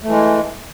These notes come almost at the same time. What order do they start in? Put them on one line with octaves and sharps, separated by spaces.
A3 E3 G#3